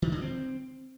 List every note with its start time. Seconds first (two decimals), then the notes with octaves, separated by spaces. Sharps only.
0.02 D#3
0.12 D3
0.21 C4